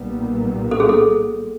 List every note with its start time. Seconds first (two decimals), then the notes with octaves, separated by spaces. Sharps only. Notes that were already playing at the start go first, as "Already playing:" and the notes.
Already playing: B1 A#2 G3 B3
0.71 A4
0.80 G#4
0.89 A4